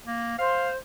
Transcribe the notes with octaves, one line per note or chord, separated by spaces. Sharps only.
A#3
C5 F5